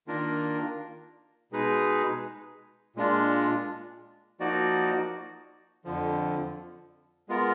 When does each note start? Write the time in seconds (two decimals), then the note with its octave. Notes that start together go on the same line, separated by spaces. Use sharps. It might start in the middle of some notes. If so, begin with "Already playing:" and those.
0.07 D#3 A#3 D4 F4 A#4
1.52 B2 G#3 D#4 G#4 B4
2.96 A#2 G#3 D4 F4
4.40 F3 A#3 D#4 F#4 D5
5.85 F2 D3 F3
7.29 G#3 B3 F4 A#4